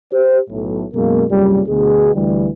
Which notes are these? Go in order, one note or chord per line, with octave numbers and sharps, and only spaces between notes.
G4 C5
B1 A2
F#2 B2 G#3 A#3
C2 F#2 A#2 C#3 G3
D2 B2 G#4
D2 E3 G3